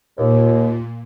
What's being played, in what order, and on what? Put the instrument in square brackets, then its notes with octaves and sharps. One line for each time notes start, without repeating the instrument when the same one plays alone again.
[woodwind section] D#2 [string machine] A#2